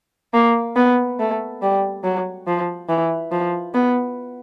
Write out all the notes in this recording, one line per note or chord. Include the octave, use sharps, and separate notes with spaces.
A#3
B3
A3
G3
F#3
F3
E3
F3
B3